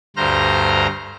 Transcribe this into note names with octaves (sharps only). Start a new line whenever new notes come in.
D2 G2 C5 A#5 F6